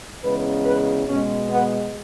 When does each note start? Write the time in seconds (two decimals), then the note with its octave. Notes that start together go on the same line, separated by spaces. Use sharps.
0.23 E2 C#3 G#3 B4
0.65 B4
1.07 B2 G#3 C#4
1.49 B3